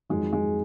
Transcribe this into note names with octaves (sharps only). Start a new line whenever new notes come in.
F2 D#3 F#3 G#3
G#3